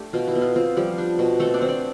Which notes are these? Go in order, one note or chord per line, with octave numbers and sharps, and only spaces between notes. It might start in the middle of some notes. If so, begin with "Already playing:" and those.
Already playing: A3 D4 G4
B2 F4
E4
B3
F4
C4 F4
F3 G3 G4
D4
B2
A3 C4 A4
D4 D5
C4
D4 D5